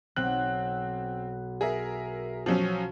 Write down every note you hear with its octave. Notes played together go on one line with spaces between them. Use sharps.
B1 C4 F#6
G#4 A#4 E5
F3 F#3 C#4